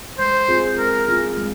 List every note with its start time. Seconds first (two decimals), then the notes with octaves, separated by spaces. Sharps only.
0.18 G#3 C5
0.48 C4 F4 G#4
0.78 G#3 A#4
1.07 C4 F4 G#4
1.37 G#3